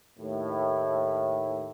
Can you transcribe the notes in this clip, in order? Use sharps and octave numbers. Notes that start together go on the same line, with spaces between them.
D#2 A2